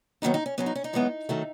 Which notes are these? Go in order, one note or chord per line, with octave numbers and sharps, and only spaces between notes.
D#2 D#3 F#3 B3 D#4
D#4
C#4
B2 F#3 B3 C#4
D#4
C#4
D#4
F#2 E3 G#3 B3
D#3 F#3 A3